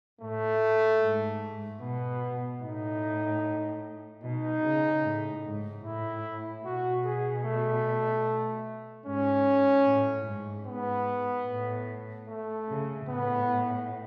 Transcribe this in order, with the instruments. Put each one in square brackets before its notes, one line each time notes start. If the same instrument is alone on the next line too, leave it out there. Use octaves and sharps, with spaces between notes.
[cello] A2 [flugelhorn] A3
[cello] G#2
[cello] B2 [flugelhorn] B3
[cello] A2 [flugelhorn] D#4
[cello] B2 [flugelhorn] D#4
[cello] C#3
A2
G#2
[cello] A2 [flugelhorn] E4
[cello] B2 [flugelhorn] F#4
[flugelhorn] G#4
A3
[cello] G#2 [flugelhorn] C#4
[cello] A2
G#2
[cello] G#2 [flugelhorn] B3
[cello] A2
[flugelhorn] A3
[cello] C#3
[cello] A2 [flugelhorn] B3